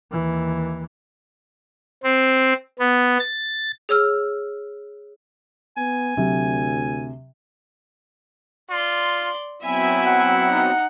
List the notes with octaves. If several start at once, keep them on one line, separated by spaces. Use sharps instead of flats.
D#2 E3
C4
B3
A6
G#4 C#5 E6 F6
B3 G#5
D2 C3 F#3 D4
F4 D5 C6
F#3 B3 C4 E4 E5 G#5
F#5
D#4